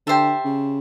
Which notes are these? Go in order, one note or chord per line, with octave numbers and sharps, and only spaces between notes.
D3 G4 C5 E5 A5
C#3